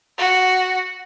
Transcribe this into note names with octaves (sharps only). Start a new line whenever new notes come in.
F#4